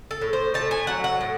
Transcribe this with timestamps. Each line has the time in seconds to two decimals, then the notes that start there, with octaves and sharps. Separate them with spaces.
0.11 A4
0.22 A2
0.33 C5
0.54 A3 A5
0.71 G#5
0.87 F#3 F#5
1.04 F#5
1.21 A2